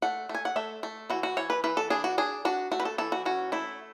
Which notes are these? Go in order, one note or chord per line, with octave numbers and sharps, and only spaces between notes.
A3 F#5
A3
G#5
F#5
A3 E5
A3
E3 F#4
F#4
E3 C#5
B4
E3 B4
A4
D4 G#4
F#4
D4 G#4
D4 F#4
A3 F#4
B4
A4
E3 A4
F#4
C#4 F#4
A3 E4